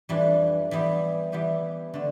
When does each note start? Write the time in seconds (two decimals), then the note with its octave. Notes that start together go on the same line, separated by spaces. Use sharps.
0.09 F2 E3 G3 D4
0.71 E3 G3 B3 E4 G4
1.32 E3 G3 B3 E4 G4
1.94 D3 A3 D4